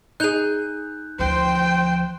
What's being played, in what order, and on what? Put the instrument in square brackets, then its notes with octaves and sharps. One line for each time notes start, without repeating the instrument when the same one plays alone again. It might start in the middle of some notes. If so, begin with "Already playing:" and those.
[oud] D#4 G#4 [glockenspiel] F#6 G6 F7
[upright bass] D2 F3 [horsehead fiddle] C5 G5